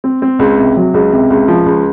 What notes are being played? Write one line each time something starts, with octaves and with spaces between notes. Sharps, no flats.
C4
C4
C#2
C3
F#3
C#2
C3
C#2
F3
C#2